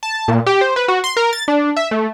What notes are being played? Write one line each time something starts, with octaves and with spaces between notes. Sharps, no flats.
A5
A#2
G4
C5
B4
F#4
C6
A#4
A6
D4
E5
A3